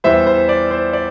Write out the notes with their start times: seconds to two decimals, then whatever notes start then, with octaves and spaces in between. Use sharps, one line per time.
0.04 E2 E3 G3 C5 E5
0.26 C5
0.49 D5
0.71 C5
0.93 D5